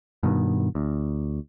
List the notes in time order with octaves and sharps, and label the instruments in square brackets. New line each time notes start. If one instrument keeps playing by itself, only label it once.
[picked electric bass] G2 B2 D#3
D2